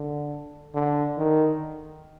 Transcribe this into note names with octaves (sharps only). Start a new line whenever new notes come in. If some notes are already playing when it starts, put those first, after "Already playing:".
Already playing: D3
D3
D#3